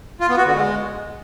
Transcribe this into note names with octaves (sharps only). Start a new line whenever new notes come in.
F4
B3
F#4
D3
G#3